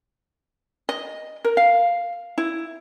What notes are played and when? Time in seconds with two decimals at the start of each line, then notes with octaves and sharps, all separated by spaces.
0.89 D#5
1.45 A#4
1.57 F5
2.38 E4